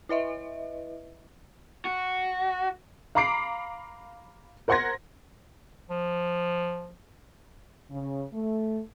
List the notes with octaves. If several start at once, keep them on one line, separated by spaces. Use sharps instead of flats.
E4 B4 D#5 E5
F#4
F5 A#5 B5 D6 C7 D7
A#4 C5 F#5 C6 G#6 A#6
F3
C#3
A3